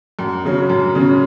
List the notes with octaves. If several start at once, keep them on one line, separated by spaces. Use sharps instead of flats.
F#2
C#3 F#3 C#4
F#2
C#3 F#3 C#4